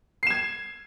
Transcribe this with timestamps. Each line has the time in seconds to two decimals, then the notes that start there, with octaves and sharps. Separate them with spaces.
0.23 C7
0.27 E7
0.30 G#6